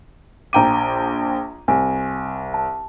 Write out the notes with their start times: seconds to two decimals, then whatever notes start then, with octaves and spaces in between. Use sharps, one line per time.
0.53 A#1 G5 A#5 D6 D#7
1.68 C2 G#5
2.54 A5